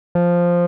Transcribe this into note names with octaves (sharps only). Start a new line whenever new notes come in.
F3